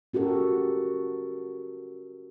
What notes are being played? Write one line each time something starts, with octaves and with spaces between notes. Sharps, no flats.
C#4 F#4 G4 A4 A#4